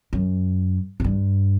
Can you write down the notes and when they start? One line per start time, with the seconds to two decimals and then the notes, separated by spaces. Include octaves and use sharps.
0.13 F#2
1.00 G#2
1.04 G2